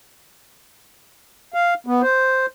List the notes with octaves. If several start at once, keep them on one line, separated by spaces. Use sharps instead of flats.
F5
B3
C5